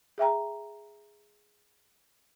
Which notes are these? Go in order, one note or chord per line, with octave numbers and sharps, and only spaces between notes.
G#4 E5 G5 A#5